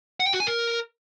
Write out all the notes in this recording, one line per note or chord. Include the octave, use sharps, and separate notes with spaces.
F#5
G5
F#4
G#5
A#4